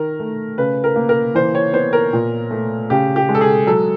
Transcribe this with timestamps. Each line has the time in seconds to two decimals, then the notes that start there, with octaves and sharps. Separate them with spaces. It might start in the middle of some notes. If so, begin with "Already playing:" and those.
Already playing: D#3 A#4
0.20 A3
0.58 C#3 B4
0.84 A#4
0.96 A#3
1.09 A#4
1.35 E3 C5
1.55 C#5
1.73 B3 C5
1.93 A#4
2.13 A#2
2.51 A3
2.90 C#3 G4
3.16 G4
3.29 G#3
3.35 A4
3.41 G#4
3.67 F#3 A4